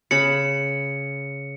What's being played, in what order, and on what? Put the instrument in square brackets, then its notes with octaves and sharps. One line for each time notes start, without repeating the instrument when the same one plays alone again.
[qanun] C#3 B5 [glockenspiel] C#7